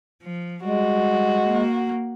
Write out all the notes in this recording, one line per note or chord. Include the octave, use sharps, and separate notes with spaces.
F3
G3 G#3 F#4
A#3